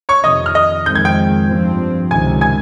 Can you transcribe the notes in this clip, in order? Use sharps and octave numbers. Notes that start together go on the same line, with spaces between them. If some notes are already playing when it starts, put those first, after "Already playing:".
C#5 C#6
F2 C3 D#3 D#5 D#6
F6
D#5 D#6
F2 D#3 G#3 C4 G6
G#6
G5 G6
G2 F3 C4
C#2 C3 D#3 G#5 G#6
G#5 G#6